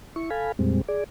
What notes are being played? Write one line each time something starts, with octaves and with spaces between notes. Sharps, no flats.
E4 C#6
A4 F5 G#5 B5
F2 A#2 G3 G#3 C4
G#4 D5